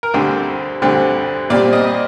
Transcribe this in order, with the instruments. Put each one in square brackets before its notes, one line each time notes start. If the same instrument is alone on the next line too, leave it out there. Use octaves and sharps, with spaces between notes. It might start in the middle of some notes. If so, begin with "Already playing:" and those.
[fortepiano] A#4
D2 D3 G3 C4 C5
D2 D3 G3 C4
A#2 G3 C4 D5
D#5